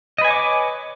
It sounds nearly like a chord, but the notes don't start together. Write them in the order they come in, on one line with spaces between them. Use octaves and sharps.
D#5 B4 G#5 C#5 D6